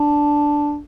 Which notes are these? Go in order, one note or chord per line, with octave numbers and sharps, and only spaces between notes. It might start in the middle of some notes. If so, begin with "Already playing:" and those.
Already playing: D4